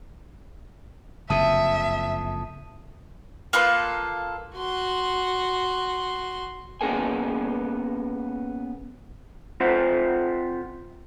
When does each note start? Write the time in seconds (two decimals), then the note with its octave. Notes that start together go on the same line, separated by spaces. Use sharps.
1.30 F#1 F2 C3 E5 A5 D#6 D#7
3.53 A#3 F4 A4 B4
4.55 F#4 C6
6.81 A#3 B3 C#4 G#4 A#4 G#5
9.60 C4 F4 C5 E5 F#5